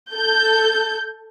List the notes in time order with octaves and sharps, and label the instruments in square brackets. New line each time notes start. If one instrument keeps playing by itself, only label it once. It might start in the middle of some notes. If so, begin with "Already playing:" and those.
[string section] A4 G6